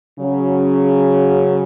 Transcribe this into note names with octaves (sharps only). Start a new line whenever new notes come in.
C#3 F#3 C#4